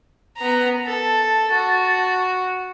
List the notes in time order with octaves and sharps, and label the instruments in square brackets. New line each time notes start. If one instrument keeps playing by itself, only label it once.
[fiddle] B3 A#5
[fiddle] A4 [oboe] A5
[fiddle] F#4